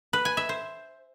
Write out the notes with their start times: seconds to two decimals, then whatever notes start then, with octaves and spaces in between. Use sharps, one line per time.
0.13 B4
0.25 G#5
0.37 E5
0.49 C5